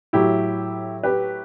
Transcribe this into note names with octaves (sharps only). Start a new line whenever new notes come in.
A2 F#3 E4 G4
G4 B4